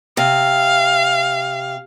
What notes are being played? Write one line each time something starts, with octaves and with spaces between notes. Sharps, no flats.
C3 F5